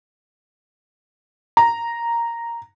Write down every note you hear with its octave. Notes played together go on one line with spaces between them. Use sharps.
A#5